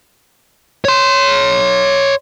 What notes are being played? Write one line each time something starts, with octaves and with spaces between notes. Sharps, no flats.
C#5 C6